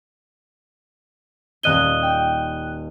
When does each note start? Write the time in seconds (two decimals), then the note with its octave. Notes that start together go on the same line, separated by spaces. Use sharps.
1.63 D#1 D#5 F#6 G#6 D#7 G7
2.03 G5